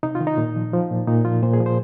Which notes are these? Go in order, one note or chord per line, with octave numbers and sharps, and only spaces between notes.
C3 D#4
F4
D#3
D#4
A#2
F3
F3
A#2
A#2 D#4
F3 F4
A#2 C5
G#4
F3
C5